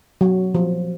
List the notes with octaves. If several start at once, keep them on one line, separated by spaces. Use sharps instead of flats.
F#3
F3